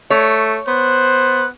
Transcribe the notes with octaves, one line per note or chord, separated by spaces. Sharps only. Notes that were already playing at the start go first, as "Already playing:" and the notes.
A3 C#5
B3 C5 F#6